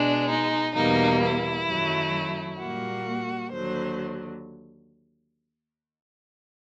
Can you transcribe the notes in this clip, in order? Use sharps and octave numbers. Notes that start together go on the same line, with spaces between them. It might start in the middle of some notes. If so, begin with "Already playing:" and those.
Already playing: B2 G#3 D4
D#4
E2 B2 G3 A#3 D#4
E4
F#2 D#3 F#3 A3
A#2 G3 A#3 F#4
D#2 D3 F#3 C5